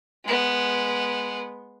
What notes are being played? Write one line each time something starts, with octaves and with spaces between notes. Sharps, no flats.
G#3 B3